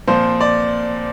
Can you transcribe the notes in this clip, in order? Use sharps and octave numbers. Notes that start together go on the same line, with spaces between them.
A#2 F3 C4 C5
D5